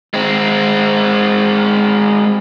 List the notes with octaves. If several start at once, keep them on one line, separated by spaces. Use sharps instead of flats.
G#3 C4